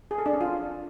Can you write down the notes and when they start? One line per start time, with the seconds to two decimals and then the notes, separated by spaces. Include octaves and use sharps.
0.11 G#4
0.18 A4
0.26 D4
0.33 C#4
0.41 F4